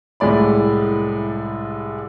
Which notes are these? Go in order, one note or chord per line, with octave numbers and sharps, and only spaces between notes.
C2 A2 G#3 D5 B5